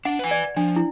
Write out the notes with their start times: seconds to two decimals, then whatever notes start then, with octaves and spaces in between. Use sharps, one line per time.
0.05 D4 F#5
0.19 B4 G#5
0.31 D5
0.57 F3 D4
0.76 E4